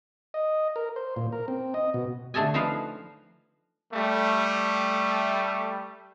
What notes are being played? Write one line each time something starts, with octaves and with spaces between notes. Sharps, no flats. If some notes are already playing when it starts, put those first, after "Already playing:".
D#5
A#4
C5
A#2
A#4
C4
D#5
B2
D3 A3 A4 D#5 G#5
D3 F3 D#4 B4 C5 F5
G3 A3